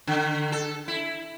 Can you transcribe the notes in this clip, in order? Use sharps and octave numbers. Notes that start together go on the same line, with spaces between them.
D3
A4
E4